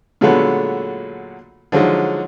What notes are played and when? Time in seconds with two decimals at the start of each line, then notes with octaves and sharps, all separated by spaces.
0.21 A#2 D3 F#3 G#3 A3 B3
1.72 D3 F3 F#3 G#3 D#4